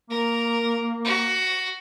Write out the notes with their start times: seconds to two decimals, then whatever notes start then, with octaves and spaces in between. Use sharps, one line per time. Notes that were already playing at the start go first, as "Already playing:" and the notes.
0.10 A#3 A#4
1.05 F#4